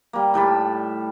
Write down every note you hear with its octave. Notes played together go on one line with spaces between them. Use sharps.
G3 A#3
A2 G3 A5 B5